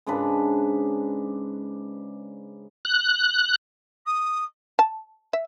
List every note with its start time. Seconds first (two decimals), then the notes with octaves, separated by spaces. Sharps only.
0.06 G#2 C#3 D4 B4
2.85 F#6
4.06 D#6
4.79 A5
5.33 E5